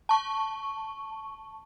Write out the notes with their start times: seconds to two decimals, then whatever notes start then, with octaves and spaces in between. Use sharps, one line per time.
0.09 A5 C#6